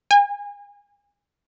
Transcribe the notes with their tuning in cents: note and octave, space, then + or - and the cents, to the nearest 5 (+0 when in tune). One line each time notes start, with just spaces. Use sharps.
G#5 -30